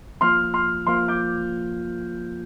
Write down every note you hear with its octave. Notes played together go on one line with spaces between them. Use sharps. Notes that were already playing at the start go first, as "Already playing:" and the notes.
F3 A#3 F4 C6 F6
C6 F6
F3 A#3 F4 C6 F6
D6 G6